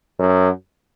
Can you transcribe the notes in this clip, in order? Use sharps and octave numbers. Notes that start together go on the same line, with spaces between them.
F#2